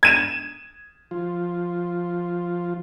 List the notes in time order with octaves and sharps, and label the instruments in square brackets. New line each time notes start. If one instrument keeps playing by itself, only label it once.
[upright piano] G#6 D#7 E7
[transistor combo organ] F3 F4